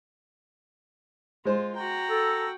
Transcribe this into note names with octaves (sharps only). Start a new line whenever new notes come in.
G#3 F4 C5
F#4 G5 A#5
A4